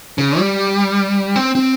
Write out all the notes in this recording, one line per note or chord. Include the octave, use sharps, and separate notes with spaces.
C#3
G3
C4
C4